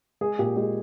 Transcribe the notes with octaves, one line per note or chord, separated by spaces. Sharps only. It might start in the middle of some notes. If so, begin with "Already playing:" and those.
G#3 G#4
A#2 G4
G#3 G4